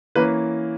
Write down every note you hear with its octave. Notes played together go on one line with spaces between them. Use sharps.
E3 A#3 C#4 B4